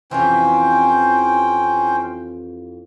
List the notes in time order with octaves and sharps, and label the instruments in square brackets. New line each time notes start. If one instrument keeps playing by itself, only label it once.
[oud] F2 C3 E3 [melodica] C#4 C5 G5